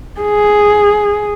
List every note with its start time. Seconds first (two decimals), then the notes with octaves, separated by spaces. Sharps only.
0.21 G#4